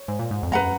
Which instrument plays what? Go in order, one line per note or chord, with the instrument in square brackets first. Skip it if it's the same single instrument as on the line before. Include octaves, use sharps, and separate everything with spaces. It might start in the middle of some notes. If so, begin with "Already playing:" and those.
Already playing: [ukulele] C#5
[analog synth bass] G#2
A#2
G#2
F2
[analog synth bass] F#2 [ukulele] B4 F#5 A#5